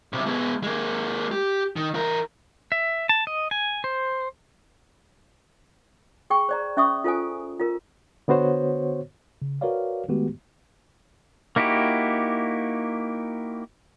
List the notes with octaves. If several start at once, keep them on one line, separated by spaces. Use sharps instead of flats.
B1 C3
G#3 B3
G#3 A#3
G4
D#3
E3 A#4
E5
A5
D#5
G#5
C5
G#4 G5 C#6
C5 D5 A#5
C#4 E5 C#6 D#6
F4 A4 C5 G#5
F4 A#4
D3 B3 F#4 C5 C#5
C#3
F#4 A#4 B4 C#5 D5 F5
D#3 G#3 A3 B3 F#4 G4
A#3 D#4 E4 F#4 G4